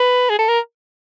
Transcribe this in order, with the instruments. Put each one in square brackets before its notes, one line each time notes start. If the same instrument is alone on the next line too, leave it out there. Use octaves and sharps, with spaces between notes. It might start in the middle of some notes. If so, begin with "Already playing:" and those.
Already playing: [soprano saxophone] B4
G#4
A4
A#4